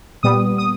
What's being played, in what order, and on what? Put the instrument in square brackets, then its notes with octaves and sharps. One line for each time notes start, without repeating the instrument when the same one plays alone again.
[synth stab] A#2 G3 B3 D#6
D#6